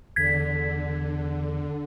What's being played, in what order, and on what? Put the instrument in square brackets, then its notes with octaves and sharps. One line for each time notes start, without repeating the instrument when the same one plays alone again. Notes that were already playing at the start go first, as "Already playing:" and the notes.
[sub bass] E2 [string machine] D3 [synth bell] G#6 B6